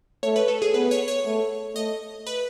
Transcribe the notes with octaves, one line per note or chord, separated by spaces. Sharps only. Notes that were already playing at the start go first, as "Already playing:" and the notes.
A3 C#5
B4
A4
G#4
B3 B4
C#5
C#5
A3
A3 D#5
B4